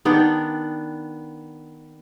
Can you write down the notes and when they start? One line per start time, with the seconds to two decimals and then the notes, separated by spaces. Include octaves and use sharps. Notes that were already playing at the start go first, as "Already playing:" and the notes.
0.05 D#3 B3 D4 G5